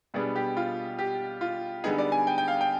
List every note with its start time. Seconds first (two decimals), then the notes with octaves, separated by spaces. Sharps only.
0.14 B2 G3 B3 D4 G#4
0.36 G4
0.57 F4
0.99 G4
1.41 F4
1.84 D3 G3 B3 D#4 G#4
1.98 D5
2.12 G#5
2.27 G5
2.38 G5
2.48 F5
2.61 G5